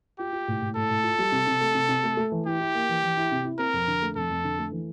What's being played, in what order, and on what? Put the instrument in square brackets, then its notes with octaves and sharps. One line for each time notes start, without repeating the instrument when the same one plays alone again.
[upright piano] F4 [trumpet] G4
[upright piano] F4
A2
A2
[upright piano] A2 [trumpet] A4
[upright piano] A2
F4
G3
C3
C3
A3
C3
C3
A3
A3
E3
[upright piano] E4 [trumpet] G4
[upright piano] E4
A#3
E3
E3
E4
C3
E4
[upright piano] C4 [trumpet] A#4
[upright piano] F2
D3
A3
[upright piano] F2 [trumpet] A4
[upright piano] F2
D3
A3
E3